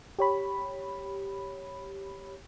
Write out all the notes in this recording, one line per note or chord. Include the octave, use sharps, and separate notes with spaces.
G4 C#5 B5